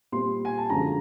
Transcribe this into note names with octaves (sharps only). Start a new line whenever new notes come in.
A#2 G3 C4 C6
G#5
A5
F#2 D3 F3 G#3 C#4 A#5